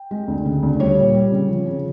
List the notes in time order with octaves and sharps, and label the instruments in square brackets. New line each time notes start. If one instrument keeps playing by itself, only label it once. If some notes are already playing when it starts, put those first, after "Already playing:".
Already playing: [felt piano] G5
G#3
D2
C#3
D2
G3 C#5
A#2
G3
C#3
F3
C#3